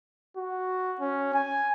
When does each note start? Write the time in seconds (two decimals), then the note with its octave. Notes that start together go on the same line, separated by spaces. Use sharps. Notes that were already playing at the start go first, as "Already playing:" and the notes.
0.37 F#4
1.00 C#4
1.34 G#5